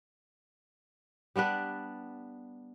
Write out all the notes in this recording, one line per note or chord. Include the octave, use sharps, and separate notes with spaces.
G3 B3 D4 B4